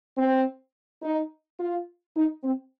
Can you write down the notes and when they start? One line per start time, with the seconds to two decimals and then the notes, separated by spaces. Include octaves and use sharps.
0.17 C4
1.02 D#4
1.59 F4
2.16 D#4
2.44 C4